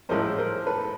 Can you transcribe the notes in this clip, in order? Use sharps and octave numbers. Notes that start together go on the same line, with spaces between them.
A1 A2 F3 G#3 C#4 A#4 C5
A#4 C5
A4 B4